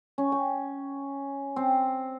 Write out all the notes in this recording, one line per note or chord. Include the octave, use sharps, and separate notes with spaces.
C#4
G5
C4